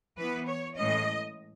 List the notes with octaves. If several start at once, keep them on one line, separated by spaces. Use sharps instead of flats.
E3 B3 B4
C#5
A2 E3 G#3 C#4 D#5